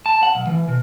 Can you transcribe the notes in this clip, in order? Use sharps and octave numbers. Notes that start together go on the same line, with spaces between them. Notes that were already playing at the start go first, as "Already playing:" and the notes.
A5
F#5
B1
E3
B2